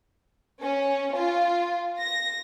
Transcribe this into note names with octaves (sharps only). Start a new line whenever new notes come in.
C#4
F4
A#6